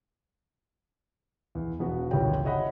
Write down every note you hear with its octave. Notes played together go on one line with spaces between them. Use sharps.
E2
E1 B3 F#4
G1 C#2 D#3 G4 C#5 G5
C#5 D#5 E5 F#5 B5